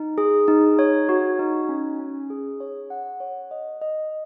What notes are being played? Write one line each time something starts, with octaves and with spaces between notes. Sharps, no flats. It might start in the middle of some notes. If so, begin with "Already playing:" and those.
Already playing: D#4
G#4
D#4
C#5
F#4
D#4
C#4
C#4
G#4
C#5
F#5
C#5
D#5
D#5